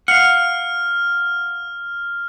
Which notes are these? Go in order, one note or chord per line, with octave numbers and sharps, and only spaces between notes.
F5 F#5 F6